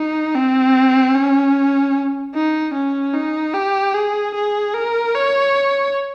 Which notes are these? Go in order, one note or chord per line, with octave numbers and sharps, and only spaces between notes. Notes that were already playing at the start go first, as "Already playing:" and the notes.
Already playing: D#4
C4
C#4
D#4
C#4
D#4
G4
G#4
G#4
A#4
C#5